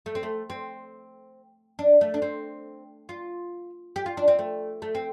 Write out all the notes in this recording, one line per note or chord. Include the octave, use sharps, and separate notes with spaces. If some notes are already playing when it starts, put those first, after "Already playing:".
A3
C4
A3
C4
D4
A3
D4
C4
F4
G4
F4
D4
C4
A3
A3
C4